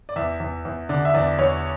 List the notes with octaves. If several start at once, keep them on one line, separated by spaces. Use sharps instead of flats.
D5
E2 E5
E2
E2
D3 D5
E5
E2 D5
E2 C#5